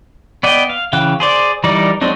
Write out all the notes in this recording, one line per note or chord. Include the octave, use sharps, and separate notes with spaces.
B3 D5 D#5 G5
F5
C#3 E3 F5 G5 F#6
G#4 C5 D5
E3 G3 D#4 A#4 D5
F#3 G#3 C4 D4 D#4